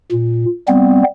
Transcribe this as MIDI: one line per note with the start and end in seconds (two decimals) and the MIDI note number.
0.11 0.45 46
0.68 1.03 55
0.68 1.03 59
0.68 1.03 60